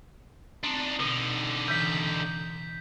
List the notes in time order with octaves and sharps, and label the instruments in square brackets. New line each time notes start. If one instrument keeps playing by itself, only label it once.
[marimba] C4 [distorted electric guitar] D4 D#4
[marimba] B2 [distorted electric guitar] D3 D#4
[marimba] C#3 E3 [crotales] G6 B6